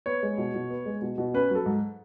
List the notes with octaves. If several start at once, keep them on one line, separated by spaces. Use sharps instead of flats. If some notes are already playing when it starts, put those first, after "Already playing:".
B3 C#5
G#3
B2
B2
B3
G#3
B2
B2
C#4 B4
F#3 A4
G#2